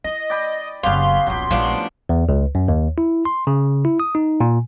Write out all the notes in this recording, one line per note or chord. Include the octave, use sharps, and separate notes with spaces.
E4 D#5
D5 G5 B5
F#1 F#3 B3 C#4 G4 F5 C6
D#1 A#1 F#3 G4
A#1 A2 F3 G#3 B3 D4
E2
C#2
F#2
D#2
E4
C6
C#3
E4
D#6
D#4
A#2